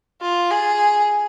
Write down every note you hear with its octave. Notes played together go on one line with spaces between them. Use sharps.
F4
G#4